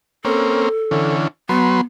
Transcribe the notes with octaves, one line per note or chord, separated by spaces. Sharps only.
A#3 C4 C#4 A4
D3 E3 C#4
F#3 B3 B4 C6